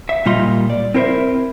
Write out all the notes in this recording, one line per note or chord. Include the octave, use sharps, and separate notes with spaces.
E5
A#2 G3 F4 D#5 C6
D5
C4 E4 A#4 C5 E5